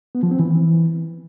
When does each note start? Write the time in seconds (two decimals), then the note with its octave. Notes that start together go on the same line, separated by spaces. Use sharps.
0.15 B3
0.23 F3
0.31 C4
0.39 E3